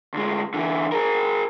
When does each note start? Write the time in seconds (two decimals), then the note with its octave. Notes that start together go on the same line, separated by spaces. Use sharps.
0.14 D2 G#3
0.54 D3 E3
0.92 G#4 A#4